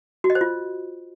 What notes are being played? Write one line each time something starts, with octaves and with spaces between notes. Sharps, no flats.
F#4
D#5
C5
F4